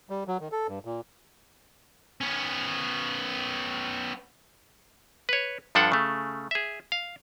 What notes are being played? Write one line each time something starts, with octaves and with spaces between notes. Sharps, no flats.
G3
F#3
D#3
A4
G2
A#2
B3 C#4
B4 C#5
G2 F3 D4 A4 F#5
C#3 A3
G#4 E5
F5